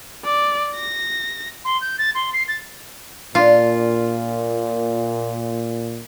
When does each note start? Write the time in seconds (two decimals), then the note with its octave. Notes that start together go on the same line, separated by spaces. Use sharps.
0.25 D5
0.76 A#6
1.64 C6
1.81 G6
1.98 A6
2.15 C6
2.33 C7
2.48 A6
3.35 A#2 D4 F4